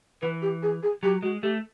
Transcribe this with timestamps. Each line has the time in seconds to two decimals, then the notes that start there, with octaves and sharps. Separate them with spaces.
0.22 E3 B4
0.42 G4
0.63 G#4
0.83 G#4
1.03 F#3 G4
1.23 G#3 F#4
1.43 A3 G4